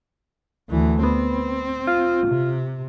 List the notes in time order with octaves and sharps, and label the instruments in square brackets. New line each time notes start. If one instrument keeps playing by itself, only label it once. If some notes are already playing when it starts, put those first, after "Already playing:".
[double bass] D2 E3
[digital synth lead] B3 [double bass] C4
[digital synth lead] F4
[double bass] C3